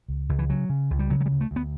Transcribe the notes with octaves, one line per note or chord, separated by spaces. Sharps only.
C#2
C#2
E3
C#3 F#3
C#3
C#2
G3
C#3 F#3
F#3
G3
D2
A3
D2
B3